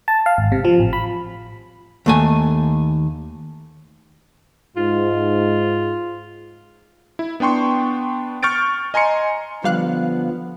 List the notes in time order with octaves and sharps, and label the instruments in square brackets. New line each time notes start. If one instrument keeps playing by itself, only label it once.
[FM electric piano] A5
F5
G#1
C3
F3
A1
B5
[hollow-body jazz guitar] D#2 A3 G#5
[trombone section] G#2 [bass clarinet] F4
[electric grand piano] E4
B3 D4 G5 C6 C#6
C#6 F6 G6 A6 D7
D#5 G#5 A#5 C6 C#7
[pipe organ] D3 F3 B3 [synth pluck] G3 F5 F#6